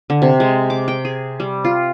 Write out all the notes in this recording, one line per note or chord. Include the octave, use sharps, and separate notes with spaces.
D3
C3
G#3
D6
G5
G#4
G3
F4